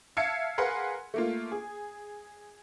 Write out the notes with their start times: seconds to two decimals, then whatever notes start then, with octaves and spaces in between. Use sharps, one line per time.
0.17 E5 F5 A5 G#6 C#7
0.58 G#4 A#4 B4 F5 F#5 C6
1.14 A3 A#3 F4
1.52 G#4